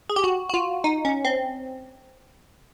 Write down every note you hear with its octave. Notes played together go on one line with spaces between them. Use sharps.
G#4
G4
F#4
F#4
F4
D#4
C#4
C4